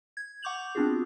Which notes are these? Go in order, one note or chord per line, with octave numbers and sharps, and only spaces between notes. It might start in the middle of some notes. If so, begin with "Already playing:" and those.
G#6
F#5 C#6 D6 G6 F7 F#7
B3 C4 D4 F4 F#4 G#4